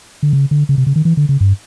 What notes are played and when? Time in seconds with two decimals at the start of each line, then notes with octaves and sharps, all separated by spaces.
0.23 D3
0.33 C#3
0.51 D3
0.69 C#3
0.78 C3
0.87 C#3
0.96 D#3
1.05 E3
1.17 D3
1.29 C#3
1.41 G2